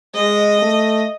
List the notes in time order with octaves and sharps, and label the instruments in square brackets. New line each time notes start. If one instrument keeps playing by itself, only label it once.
[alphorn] G#3 [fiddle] D#5
[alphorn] A3